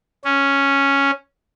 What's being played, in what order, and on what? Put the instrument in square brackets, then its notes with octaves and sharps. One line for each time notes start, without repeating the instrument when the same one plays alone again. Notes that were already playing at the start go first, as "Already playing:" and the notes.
[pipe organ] C#4